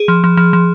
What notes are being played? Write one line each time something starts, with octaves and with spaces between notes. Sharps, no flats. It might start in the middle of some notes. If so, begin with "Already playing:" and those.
Already playing: G#4
F3
F3
F3
F3